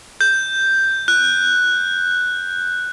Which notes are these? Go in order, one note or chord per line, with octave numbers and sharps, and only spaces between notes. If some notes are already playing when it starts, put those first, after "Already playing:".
G6
F#6